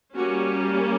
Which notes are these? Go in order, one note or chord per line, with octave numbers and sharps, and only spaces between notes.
G3 A#3 C#4 F#4